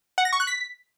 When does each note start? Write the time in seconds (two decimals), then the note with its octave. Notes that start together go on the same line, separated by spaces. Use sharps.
0.18 F#5
0.25 A#6
0.33 C#6
0.40 F#6
0.47 B6